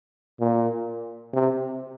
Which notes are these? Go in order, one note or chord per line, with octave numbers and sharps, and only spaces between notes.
A#2
C3